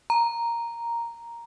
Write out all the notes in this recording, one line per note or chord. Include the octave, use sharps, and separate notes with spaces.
A#5